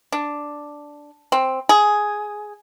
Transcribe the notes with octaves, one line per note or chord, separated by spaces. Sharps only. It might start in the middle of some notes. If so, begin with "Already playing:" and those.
D4
C4
G#4